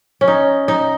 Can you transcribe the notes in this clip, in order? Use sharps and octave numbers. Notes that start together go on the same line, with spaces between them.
C#4
D#4
D#4